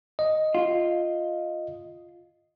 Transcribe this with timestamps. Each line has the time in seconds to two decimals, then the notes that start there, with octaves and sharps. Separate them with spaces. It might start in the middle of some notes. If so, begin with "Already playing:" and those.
0.19 D#5
0.55 F4